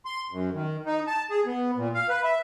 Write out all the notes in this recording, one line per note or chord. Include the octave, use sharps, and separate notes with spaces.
C6
F#2
D#3
D#4
A5
G#4
B3
A#2
F5
B4
E5